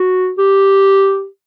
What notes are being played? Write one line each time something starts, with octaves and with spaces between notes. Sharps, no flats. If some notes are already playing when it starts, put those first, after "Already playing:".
Already playing: F#4
G4